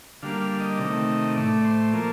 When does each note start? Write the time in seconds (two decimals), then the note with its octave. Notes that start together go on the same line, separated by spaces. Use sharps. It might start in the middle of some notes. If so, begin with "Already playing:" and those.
0.22 D3 G3 A#3 F5
0.41 F5
0.60 D#5
0.78 C3 D#3 A3
1.36 A2 A3 D5
1.65 C5
1.92 A#2 F3 A#3 A4